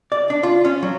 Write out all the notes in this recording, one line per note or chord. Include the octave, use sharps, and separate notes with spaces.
D5
D4
F4
C#4
F#3